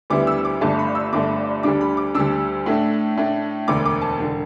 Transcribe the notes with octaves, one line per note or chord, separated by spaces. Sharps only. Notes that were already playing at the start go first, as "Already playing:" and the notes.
D2 D3 G3 B3 E4 D6
E6
D6
G1 G2 D3 A3 A5
B5
E6
G1 G2 D3 A3 D6
D2 D3 G3 D4 D6
B5
D6
D2 D3 G3 D4 E6
A2 A3 D4
A2 A3 D4
E1 D2 D3 D6
D6
A5
E1 D3